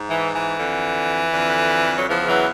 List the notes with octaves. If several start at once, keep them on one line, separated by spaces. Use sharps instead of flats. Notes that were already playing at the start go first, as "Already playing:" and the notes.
Already playing: G#2
E3
E3
F2 D3
F2 D3
F#3
E2 C#3 E3 F3
E3 F#3